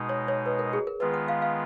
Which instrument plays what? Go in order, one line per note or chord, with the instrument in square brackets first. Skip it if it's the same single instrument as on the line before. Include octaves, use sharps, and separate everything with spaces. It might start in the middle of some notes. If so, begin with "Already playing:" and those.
Already playing: [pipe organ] B2 G#3 D#4
[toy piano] C#5
C#5
B4
A#4
G#4
A#4
[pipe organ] D#3 G#3 B3 F4 [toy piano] B4
[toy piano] F#5
F5
F5